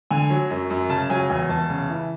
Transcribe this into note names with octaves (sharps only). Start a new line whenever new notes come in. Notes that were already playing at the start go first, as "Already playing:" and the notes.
D3 G#5
F#3
F#2
F#2
C#3 A5
F#3 G#5
E2 G#5
E2 A5
C#3
E3